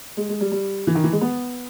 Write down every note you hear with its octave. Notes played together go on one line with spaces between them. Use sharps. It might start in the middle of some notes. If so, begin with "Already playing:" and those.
G#3
G#3
G3
G3
E3
D#3
E3
G#3
B3